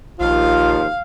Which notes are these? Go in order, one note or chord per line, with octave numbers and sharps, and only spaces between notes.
A#1 D#2 F3 F4 F5